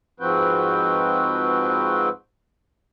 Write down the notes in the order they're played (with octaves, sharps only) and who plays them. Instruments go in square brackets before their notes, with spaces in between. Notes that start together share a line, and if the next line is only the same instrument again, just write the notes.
[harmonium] G#2 F3 C4 F#4 B4 G5